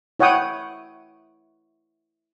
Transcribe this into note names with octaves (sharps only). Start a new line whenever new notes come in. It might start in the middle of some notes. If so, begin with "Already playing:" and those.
E4 C#5 F#5 G5 D#6